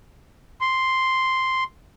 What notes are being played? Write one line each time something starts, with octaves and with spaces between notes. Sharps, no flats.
C6